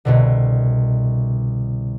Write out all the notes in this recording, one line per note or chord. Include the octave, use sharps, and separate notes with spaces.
C2 B2 D3